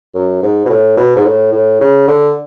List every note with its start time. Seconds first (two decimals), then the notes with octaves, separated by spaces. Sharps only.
0.14 F#2
0.42 G#2
0.66 B2
0.69 A2
0.97 B2
1.16 G#2
1.25 A2
1.53 A2
1.80 C#3
2.08 D3